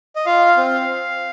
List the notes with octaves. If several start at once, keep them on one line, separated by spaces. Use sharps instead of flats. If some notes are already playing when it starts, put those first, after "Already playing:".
D#5
F4 F5
C4